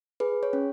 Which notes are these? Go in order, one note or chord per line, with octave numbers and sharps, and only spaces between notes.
G#4 B4
C#5
C#4